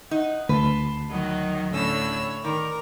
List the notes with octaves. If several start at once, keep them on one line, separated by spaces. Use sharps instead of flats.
D#4 F#5
D2 B4 A5 C6
D#3 F#3 D#5 F#5
A2 D3 C#4 C#5 B5 E6
D#3 A#4 D5